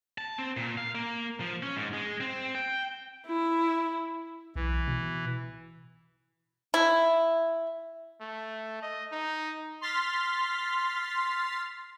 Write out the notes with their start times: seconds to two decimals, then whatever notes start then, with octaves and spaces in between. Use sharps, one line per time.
0.18 A5
0.39 C4
0.57 A#2
0.77 F5
0.95 A#3
1.40 F3
1.63 C#4
1.76 G#2
1.93 G#3
2.21 C4
2.55 G5
3.26 E4
4.56 B1 E3
4.88 B2
6.74 E4
8.21 A3
8.82 D#5
9.12 D#4
9.81 C6 F6 A6 B6